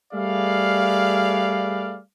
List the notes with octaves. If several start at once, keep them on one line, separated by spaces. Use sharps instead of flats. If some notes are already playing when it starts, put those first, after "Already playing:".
G3 A3 G#4 B4 D5 F5